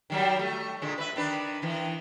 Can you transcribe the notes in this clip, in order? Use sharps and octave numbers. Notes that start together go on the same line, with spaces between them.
D#3 F#3 G3
A3
A#2 D3 G#3
B4 E5
D#3 D4 B4
D#3 E3